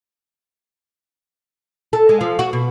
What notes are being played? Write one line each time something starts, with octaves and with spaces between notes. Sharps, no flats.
A4
G#3
F3
F#4
B2